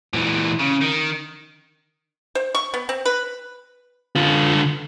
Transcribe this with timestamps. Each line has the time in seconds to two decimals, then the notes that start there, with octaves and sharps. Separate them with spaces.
0.14 A#2 E3
0.60 C#3
0.82 D#3
2.35 C5
2.55 C#6
2.74 B3
2.89 C4
3.05 B4
4.16 D3 F4